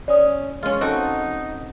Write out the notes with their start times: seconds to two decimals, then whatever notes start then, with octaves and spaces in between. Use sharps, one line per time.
0.08 C#4 D5 D#6
0.63 G#3 C#4 F4
0.81 C4 D#4 F#4 A4